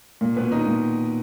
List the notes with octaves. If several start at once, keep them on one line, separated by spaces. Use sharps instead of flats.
A#2
B2 B3
D#3 D#4
A#2